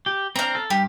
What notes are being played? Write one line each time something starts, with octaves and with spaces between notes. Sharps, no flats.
G4
C4 D4 F5 A#5
A4
G2 G4